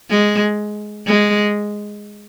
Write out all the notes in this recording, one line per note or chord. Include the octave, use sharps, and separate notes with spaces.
G#3
G#3